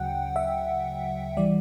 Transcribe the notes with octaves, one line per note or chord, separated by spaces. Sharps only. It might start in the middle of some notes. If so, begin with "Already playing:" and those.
Already playing: D2 C#3 F#3 F#5 G5
E5
E3 G3 D5